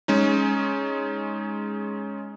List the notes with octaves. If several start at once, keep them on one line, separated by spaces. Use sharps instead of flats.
G#3 C#4 D#4